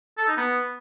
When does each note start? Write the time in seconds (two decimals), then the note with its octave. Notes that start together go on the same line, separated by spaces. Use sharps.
0.18 A4
0.27 D#4
0.37 B3